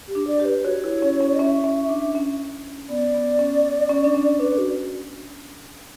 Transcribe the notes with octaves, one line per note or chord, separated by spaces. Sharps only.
G4
D4
D5
G4
B4
F#4 C#5
E4
C#4
C#4
C#4 E5
C#4
D4
C#4
B3 D5
B3
C#4
C#4
D4
C#4
D4 B4
F#4